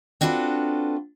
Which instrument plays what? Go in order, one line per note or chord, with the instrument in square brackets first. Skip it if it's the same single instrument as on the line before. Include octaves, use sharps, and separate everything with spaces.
[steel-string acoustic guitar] C4 D4 F4 F#4 A4 B4